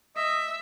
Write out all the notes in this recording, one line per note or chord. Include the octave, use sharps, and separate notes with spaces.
D#5 E5